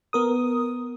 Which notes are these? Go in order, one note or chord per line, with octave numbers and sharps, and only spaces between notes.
B3 A#4 D#6